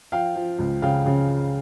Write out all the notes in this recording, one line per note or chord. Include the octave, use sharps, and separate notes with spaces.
F3 F5 G5
F3
C#2
C#3 F5 G5
C#3